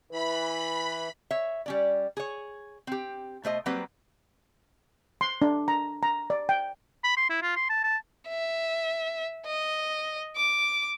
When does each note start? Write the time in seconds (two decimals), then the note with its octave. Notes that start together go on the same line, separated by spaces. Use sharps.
0.11 E3 B4 B5
1.31 C#5 E5
1.66 G3 C#4 D5
2.17 G#4 C#5
2.87 C4 G4
3.44 B2 A3 C5 D#5
3.66 F#3 G3 A#3 C4 B4 C5
5.21 C6
5.42 D4
5.68 A#5
6.03 A#5
6.30 D5
6.49 G5
7.04 B5
7.17 C6
7.29 E4
7.43 F4
7.56 C6
7.70 A5
7.84 A5
8.29 E5
9.46 D#5
10.36 D6